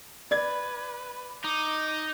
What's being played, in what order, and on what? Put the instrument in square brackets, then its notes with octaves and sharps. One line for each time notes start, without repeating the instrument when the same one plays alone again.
[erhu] B4 [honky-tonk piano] D5 G#6
[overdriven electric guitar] D#4 [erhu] D6